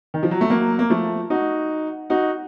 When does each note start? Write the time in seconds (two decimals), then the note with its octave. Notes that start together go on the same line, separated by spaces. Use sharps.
0.14 D#3
0.23 F3
0.31 F#3
0.41 A3
0.50 F#3 A#3
0.79 A#3
0.90 F3 A3
1.30 D#4 F#4
2.10 D#4 F#4